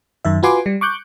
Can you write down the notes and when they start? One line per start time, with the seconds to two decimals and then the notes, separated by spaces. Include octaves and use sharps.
0.25 F#2 D#3 E5
0.43 F4 F#4 B4 G#5 C6 D6
0.66 G3
0.81 C#6 D6 F#6 G6